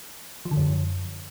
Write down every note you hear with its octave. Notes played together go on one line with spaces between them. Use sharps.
F3
D3
F#2